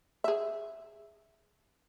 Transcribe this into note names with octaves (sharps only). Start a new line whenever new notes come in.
G#4 E5